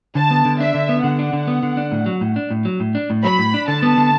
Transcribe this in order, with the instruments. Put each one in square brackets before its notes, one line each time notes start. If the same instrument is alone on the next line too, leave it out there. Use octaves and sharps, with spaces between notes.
[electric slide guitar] D3 [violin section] A5
[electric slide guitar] B3
D3
[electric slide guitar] D4 [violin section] E5
[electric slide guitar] D3
B3
[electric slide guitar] D3 [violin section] F#5
[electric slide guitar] D4
D3
B3
D3
D4
A2
F#3
A2
D4
A2
F#3
A2
D4
A2
[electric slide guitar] F#3 [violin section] B5
[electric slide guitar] A2
D4
[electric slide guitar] D3 [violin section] A5
[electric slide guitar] B3
D3